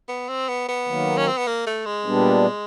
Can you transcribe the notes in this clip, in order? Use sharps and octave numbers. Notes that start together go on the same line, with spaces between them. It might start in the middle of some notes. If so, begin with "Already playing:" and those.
B3
C4
B3
B3
D#3 F#3 A#3
C#4
C4
B3
A#3
A3
G#3
A#2 G3 B3 D4